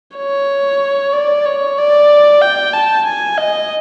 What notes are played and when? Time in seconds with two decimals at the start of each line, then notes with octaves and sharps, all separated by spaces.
0.17 C#5
1.13 D5
1.46 C#5
1.78 D5
2.42 G5
2.73 A5
3.05 G#5
3.38 D#5